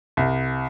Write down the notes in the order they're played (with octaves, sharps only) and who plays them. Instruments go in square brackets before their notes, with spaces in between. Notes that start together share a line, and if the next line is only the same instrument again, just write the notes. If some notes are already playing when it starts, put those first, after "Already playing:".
[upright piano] C2